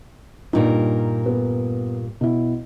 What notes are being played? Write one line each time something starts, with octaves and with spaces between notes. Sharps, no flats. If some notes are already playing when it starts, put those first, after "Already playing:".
G2 A#2 D4 D#4 F4 A#4
B3
B2 E4